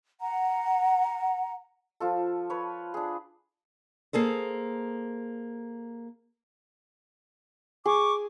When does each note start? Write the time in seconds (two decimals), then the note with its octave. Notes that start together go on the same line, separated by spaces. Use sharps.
0.20 F#5 A#5
2.00 F3 F4 A4
2.50 B4 C#5
2.94 D4 G#4
4.13 A#3 G#4 A4 C5
7.86 G#4 C#6 D6